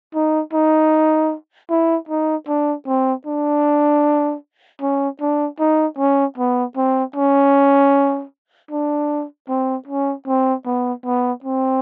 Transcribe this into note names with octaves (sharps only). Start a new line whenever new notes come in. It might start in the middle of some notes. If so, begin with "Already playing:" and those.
D#4
D#4
E4
D#4
D4
C4
D4
C#4
D4
D#4
C#4
B3
C4
C#4
D4
C4
C#4
C4
B3
B3
C4